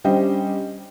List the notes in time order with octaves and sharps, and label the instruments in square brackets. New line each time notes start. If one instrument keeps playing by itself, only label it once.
[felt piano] G3 C#4 D4 G4 C5 D#5